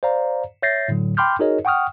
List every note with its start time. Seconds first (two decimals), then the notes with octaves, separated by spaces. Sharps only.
0.03 C5 D5 F5 A#5
0.62 C#5 E5 G6 A6 A#6 C7
0.88 A2 D3 F#3
1.17 G5 B5 C6 D6 F6 G6
1.39 D#4 F#4 G#4 A#4 C#5 D#5
1.65 F#5 G5 C#6 D#6 F6